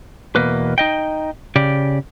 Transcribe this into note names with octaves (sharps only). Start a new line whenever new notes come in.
E2 B2 A#3 B4
D#4 D#5 G5
C#3 G4 D5